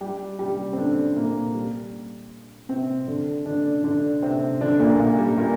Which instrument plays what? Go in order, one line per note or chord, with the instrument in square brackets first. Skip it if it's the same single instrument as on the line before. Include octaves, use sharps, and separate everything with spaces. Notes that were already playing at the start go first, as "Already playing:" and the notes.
[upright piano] G3 G4
G3 G4
C4
D3 D4
A#2 A#3
G3
C3 C4
D3 D4
D3 D4
D3 D4
C3 C4
D3 D4
A#2 A#3
A#2 A#3
G3
A#2 A#3